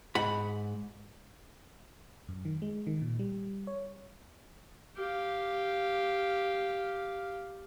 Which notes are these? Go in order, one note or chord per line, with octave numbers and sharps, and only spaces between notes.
G#2 F#5 B5
F#2
D#3
G#3
D#3
A#2
G3
C#5
G4 F5